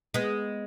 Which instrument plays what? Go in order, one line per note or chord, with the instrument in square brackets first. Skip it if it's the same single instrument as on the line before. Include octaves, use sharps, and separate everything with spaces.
[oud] G#3 B3